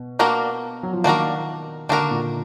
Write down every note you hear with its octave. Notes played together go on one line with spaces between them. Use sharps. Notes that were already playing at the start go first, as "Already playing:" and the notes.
Already playing: B2
A#3 D4 F#4 A#4
F#3
F3
D#3 A#3 D4 F#4 A#4
D3 A#3 D4 F#4 A#4
A#2